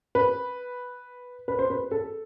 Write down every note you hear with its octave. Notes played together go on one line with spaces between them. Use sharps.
B4
B4
C5
B4
A4